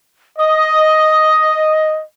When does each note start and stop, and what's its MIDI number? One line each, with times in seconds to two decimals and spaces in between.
0.39 2.02 75
0.39 1.71 87